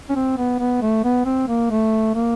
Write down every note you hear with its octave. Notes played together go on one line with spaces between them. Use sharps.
C#4
C4
B3
B3
A3
B3
C4
A#3
A3
A#3